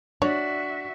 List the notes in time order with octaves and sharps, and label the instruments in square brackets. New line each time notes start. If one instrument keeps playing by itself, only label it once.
[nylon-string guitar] D4 [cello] F#4 E5 [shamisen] C#5